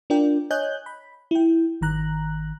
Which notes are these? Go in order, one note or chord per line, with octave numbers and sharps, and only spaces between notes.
D4 F4 A#4 D5 G5
C#5 D#5 G#5 F#6 G6
B5
E4 G5
G#1 D#3 A#5 F#6